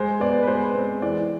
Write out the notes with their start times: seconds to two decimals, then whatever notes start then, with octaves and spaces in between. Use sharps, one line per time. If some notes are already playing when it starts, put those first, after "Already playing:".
Already playing: G#3 C5
0.20 B3 D5
0.43 B4
0.47 G#3 C5
0.75 C4
1.02 E3 D5